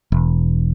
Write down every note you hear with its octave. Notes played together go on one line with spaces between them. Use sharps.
E1